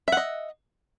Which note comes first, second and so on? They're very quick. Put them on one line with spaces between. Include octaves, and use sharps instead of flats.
E5 F#5 D#5